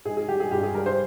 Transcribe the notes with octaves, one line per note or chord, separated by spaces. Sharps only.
G#2 G#4
G#4
G3 G4
G#4
G2 G4
G#4
G3 A#4
C5